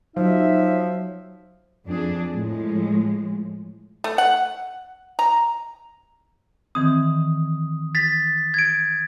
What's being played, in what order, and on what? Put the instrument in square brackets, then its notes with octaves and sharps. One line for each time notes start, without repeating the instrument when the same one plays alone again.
[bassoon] F3 [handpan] F#3 [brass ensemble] D#4 E5
[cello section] F2 D4 G#4
A2 F3 G#3
[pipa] A3
F#5
A#5
[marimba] D#3 E3 C4 [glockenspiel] D#6
[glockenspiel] A6 B6
G#6 D7